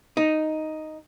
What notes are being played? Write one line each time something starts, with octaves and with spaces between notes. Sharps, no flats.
D#4